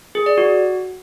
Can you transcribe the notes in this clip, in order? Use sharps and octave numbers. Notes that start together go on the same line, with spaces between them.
G#4
D5
F#4